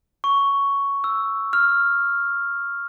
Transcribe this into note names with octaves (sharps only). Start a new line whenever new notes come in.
C#6
E6
F6